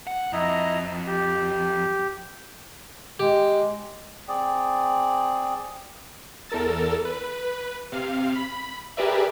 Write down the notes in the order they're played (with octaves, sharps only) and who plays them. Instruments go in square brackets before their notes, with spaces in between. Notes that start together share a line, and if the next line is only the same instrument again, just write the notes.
[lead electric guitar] F#5
[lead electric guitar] F2 [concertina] E4 D#5 A#5
[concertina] G4
[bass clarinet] G#3 [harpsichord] G4
[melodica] C4 G#4 D5
[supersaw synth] E2 A4 A#4 E6 A6
B4
C3 F5
B5
G4 G#4 A#4 B4 D5 E5